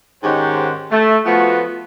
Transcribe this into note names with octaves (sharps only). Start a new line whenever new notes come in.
G#2 D#3 C#4 G4 C5 F#5
A3
F3 A3 B3 F4 F#4